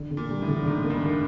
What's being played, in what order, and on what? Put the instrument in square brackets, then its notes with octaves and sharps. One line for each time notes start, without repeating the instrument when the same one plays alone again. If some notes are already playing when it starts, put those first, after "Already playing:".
Already playing: [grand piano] D3
D3
[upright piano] A#2
[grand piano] G3
[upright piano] A2
[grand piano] D3
[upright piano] G#2 [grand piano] D3
[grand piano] A#3
[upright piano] G2
[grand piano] D3